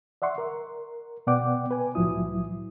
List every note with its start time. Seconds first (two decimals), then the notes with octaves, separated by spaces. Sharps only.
0.22 D5 E5 F#5 C6 C#6
0.38 A#4
1.27 B2 B3 D5 F#5 G5 D6
1.71 B4 G#5
1.95 C2 A2 F3 F#3 E4 D#6